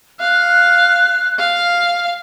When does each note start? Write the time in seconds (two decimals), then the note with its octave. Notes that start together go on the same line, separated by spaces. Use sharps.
0.20 F5 F#6
1.39 F5